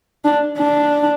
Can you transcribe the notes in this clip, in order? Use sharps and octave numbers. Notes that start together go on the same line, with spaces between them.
D4
D4